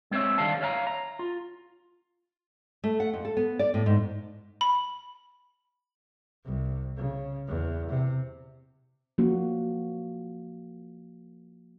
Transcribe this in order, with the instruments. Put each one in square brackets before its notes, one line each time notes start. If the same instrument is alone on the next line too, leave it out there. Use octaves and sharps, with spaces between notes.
[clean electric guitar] G#3 C4 C5 C#5 E5
D3 D#3 G3 F5 A5
C#5 E5 F5 A5 A#5
A#5
F4
[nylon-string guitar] A3
F#5
F2
A4
B3
D5
A2
G#2
[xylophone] B5
[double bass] C2
C#3
E2
C3
[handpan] F3 A#3 C#4 F#4